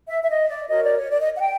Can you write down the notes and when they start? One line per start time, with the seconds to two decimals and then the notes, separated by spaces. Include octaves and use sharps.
0.09 E5
0.23 E5
0.29 D#5
0.49 D5
0.68 F#4 A#4 C#5 D#5
0.83 D5
0.96 C#5
1.09 D5
1.19 D#5
1.35 F#5
1.39 G5